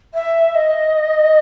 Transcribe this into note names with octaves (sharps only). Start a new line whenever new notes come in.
E5
D#5